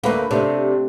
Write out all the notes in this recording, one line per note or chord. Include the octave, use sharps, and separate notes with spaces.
D2 A3 A#3 B4
C3 A3 D4